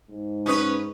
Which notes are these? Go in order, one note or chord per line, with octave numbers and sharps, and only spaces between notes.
G#2
C#4 D#4 B4 C#6 D#6